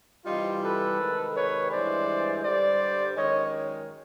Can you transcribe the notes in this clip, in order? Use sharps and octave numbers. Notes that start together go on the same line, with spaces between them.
C3 E3 G3 D#4 F4
A4 B4
C3 D#3 G#3
B4 C#5
G2 E3 G#3 C5 D5
G2 D3 G3 C5 D5
F#2 D#3 G#3 C#5 D#5